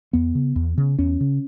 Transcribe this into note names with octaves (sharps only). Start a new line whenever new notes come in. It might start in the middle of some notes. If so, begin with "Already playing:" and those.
E2 B3
C#3
E2
C#3
E2 C#4
C#3